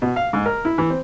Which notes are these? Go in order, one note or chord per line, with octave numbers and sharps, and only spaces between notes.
B2
F5
G#2
A#4
E4
E3
C4